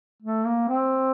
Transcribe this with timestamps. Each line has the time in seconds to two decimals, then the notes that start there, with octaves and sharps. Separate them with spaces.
0.23 A3
0.46 A#3
0.68 C4